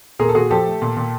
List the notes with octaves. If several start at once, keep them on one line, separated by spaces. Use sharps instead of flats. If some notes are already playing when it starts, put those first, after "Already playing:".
A#2 G#4 A#4
A4
A#2 F#4 G#4
F3 G4 A4
A3
A#2
A#2